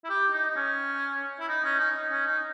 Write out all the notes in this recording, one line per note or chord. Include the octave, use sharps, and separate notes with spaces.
E4
G4
D#4
D#4
C#4
E4
D#4
C#4
D#4
D#4
C#4
D#4